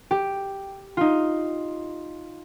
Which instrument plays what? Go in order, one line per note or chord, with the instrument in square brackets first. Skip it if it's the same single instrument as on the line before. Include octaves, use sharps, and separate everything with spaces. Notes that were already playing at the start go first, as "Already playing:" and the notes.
[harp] G4
D#4 F4